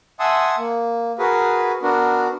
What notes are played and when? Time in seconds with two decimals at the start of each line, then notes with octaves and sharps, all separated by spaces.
0.20 E5 F#5 G#5 A5 C6 D#6
0.58 A#3
1.19 F#4 G#4 A#4 B4
1.82 B3 D4 F#4 A#4